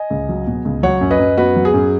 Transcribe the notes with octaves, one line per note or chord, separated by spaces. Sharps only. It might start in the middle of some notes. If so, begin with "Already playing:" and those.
Already playing: D#5 G#5
C#2
F#3
B2
C#2
F#3 C#5 F#5
F#2
B4 D#5
F#2
B3 F#4 B4
F#3
G#4
F#2